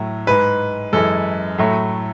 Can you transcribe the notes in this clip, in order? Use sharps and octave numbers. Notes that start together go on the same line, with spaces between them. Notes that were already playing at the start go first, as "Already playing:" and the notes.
Already playing: A2 F#3 A3
G#2 G#3 B4
F#2 E3 G#3 A4
A2 F#3 A3